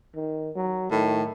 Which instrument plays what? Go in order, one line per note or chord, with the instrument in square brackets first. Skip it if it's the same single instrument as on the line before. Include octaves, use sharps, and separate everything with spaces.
[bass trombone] D#3
F#3
[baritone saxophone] A2 [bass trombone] D#3